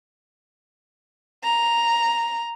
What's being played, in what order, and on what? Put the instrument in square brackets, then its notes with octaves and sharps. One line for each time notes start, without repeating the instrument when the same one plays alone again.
[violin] A#5